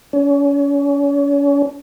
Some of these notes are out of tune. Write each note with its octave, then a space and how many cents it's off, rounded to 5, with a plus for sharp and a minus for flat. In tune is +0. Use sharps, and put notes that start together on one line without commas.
C#4 +35